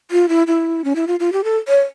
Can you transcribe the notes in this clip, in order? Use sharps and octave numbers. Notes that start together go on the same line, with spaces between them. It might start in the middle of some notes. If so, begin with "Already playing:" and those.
F4
E4
E4
C#4
E4
F4
F4
G4
A4
C#5